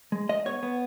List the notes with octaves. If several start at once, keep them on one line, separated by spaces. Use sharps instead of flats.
G#3
G#3 D#5
B3 C#5
B3